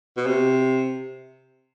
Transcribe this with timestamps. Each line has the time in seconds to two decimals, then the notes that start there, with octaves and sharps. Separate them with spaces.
0.17 B2
0.26 C3